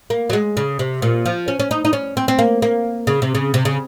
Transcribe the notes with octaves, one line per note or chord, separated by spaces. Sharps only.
A#3
F#3
G#3
C#3
C3
A#2
F3
C#4
C#4
D#4
D#4
C#4
C4
C4
A#3
A#3
C#3
C3
C#3
C3
C#3